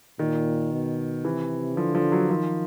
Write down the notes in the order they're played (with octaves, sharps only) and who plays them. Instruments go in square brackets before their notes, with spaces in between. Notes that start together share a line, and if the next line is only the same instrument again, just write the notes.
[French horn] A#2 [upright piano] D#3
[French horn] B2
[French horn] C3 [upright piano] E3
[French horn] D3 [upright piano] F3
[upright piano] F3
F#3
[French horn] D#3 [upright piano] F3